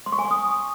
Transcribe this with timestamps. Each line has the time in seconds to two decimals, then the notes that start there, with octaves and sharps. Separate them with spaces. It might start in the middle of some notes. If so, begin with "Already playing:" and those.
0.06 C6
0.12 C#6
0.19 G#5
0.25 C#6
0.31 D#6